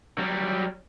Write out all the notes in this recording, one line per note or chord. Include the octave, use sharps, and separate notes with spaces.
F#3 G3